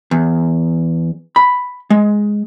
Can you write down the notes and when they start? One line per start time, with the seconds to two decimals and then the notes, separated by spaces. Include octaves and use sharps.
0.11 E2
1.36 B5
1.90 G#3